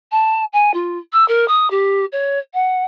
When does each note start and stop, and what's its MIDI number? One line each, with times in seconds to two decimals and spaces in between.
0.11 0.43 81
0.52 0.71 80
0.73 0.98 65
1.12 1.26 88
1.28 1.45 70
1.48 1.69 87
1.70 2.05 67
2.12 2.39 73
2.53 2.85 78